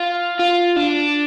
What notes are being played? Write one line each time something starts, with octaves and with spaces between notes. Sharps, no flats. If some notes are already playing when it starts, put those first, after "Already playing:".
Already playing: F4
F4
D4